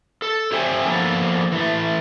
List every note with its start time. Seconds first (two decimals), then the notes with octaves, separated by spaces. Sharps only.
0.22 A4
0.52 G4 C5 C#5 E5 G5 G#5
0.85 F3 A#3 B3 D4 A4
1.52 E3 A3